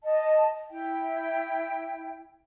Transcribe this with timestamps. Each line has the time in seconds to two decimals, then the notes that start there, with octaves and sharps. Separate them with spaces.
0.03 D#5 A5
0.70 E4 G5